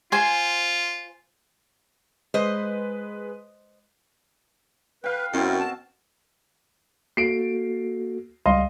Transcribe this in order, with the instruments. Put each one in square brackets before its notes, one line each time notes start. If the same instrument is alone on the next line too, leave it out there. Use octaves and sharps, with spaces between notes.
[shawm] F4 [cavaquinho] C5 G#5
[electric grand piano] G#3 B4 [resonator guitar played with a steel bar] C5 D#5
[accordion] B4 [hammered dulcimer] F5 G5
[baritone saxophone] F#2 [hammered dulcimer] B2 C4 [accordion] E4 A#4
[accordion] A5
[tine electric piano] A#3 F#4 A4 [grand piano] C7 D7
[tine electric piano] C#2 G3 [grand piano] D#5 F5 C6